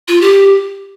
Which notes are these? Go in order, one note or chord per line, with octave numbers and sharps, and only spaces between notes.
F4
G4